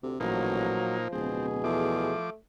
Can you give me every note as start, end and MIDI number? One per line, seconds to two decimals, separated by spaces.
0.03 0.14 38
0.03 0.17 48
0.20 0.83 33
0.20 1.08 46
0.20 1.53 53
0.20 0.97 54
0.20 1.08 58
0.20 1.08 63
1.12 1.62 26
1.12 2.12 47
1.12 1.46 60
1.12 2.12 68
1.64 2.18 40
1.64 2.30 53
1.64 2.36 57
1.64 2.30 86